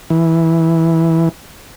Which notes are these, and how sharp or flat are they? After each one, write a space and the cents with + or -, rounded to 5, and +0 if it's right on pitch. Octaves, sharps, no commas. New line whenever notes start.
E3 -10